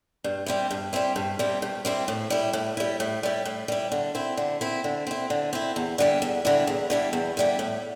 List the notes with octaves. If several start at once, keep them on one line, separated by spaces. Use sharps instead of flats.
G2
G3 C4 E4
G2
G3 C4 E4
G2
G3 C4 E4
G2
G3 C4 E4
A2
G3 E4
A2
G3 E4
A2
G3 E4
A2
G3 E4
D3
C4 E4
D3
C4 E4
D3
C4 E4
D3
C4 E4
E2
D3 G3 E4
E2
D3 G3 E4
E2
D3 G3 E4
E2
D3 G3 E4
A2